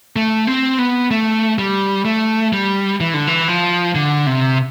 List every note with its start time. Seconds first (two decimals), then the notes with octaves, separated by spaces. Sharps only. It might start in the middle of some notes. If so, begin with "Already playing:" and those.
0.16 A3
0.47 C4
0.78 B3
1.11 A3
1.58 G3
2.05 A3
2.53 G3
3.01 E3
3.14 D3
3.27 E3
3.48 F3
3.95 D3
4.27 C3